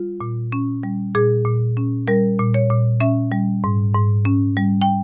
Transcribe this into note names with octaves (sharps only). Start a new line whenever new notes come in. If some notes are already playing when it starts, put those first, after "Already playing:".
Already playing: G3 F4
A#2
C#4
G3
A#2 G#4
A#2
C#4
G3 A#4
A#2
C#5
A#2
C#4 E5
G3
G#2
G#2
C#4
G3
G5